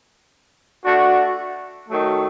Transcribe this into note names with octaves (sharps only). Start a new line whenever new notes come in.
A3 D4 F#4
D#3 F#3 A3